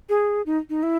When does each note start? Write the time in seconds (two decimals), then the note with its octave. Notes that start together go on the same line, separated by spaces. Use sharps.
0.09 G#4
0.46 D#4
0.70 D#4
0.83 E4